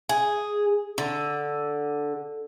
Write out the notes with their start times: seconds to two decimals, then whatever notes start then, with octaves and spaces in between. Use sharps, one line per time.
0.09 G#4
0.98 D3